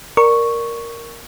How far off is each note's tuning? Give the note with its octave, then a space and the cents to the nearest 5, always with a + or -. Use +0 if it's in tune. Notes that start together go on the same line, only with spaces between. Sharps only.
A#4 +0 D5 +0 C#6 +0